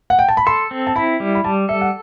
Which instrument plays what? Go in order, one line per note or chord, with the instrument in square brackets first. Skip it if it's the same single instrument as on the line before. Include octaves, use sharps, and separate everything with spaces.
[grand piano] F#5
G5
A5
B5
[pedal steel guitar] A4 [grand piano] C6
[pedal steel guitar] C4
[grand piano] A5
[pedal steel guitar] E4 [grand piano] B5
[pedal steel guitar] G3
[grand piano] B5
[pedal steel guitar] G3 [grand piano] A5
[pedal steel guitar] A4 [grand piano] E5
[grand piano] F#5